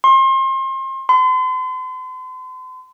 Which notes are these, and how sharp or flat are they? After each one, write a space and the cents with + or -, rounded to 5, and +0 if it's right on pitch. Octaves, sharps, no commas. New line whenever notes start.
C6 +35
C6 -40